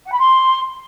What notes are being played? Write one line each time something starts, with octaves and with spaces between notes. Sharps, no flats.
F#5
B5
C6